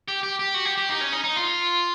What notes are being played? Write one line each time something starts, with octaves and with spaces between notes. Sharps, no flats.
G4
G4
G4
F#4
G4
G4
D#4
C#4
D#4
D#4
F4